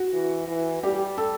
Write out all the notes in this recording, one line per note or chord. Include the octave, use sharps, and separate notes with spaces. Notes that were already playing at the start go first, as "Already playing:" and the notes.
Already playing: F#4
E3
E3
G3 G4
A4